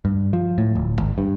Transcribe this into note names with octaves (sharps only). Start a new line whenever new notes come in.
G2
F3
A2
D1
G#1
G2